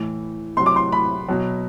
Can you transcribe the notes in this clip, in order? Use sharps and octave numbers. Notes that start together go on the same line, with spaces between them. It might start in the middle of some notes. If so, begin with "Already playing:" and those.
Already playing: A2 E3
C3 F#3 C6
D6
C6
B5
B2 F#3